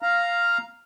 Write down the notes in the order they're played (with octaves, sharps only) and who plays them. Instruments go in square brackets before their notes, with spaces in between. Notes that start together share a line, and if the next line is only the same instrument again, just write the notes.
[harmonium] F5 A#5